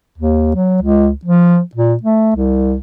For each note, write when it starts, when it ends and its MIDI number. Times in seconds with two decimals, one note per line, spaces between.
0.18 0.50 39
0.55 0.82 54
0.82 1.09 37
1.25 1.59 53
1.75 1.94 46
2.03 2.33 57
2.35 2.77 36